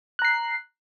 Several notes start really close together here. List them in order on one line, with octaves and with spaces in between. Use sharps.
F#6 A#5 C7